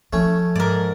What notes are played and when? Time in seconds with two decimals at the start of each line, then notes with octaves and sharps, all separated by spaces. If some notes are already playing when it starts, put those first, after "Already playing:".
0.13 F3 A3 C#4
0.55 G#2 A#4 D5